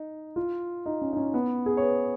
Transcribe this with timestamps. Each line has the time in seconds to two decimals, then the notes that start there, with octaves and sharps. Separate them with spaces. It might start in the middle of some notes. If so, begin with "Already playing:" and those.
Already playing: D#4
0.36 F4
0.86 D#4
1.02 C#4
1.13 D#4
1.17 C#4
1.34 B3
1.66 G#4
1.77 C#5
1.82 B4